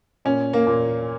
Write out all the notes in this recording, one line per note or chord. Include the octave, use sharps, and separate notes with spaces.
A#2 C#4
A#3
A#2